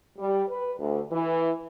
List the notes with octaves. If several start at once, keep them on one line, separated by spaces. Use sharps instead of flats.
G3
B4
D2
E3